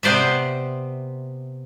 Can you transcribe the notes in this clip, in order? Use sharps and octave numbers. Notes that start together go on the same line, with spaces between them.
C3 B3 C5 D5 E5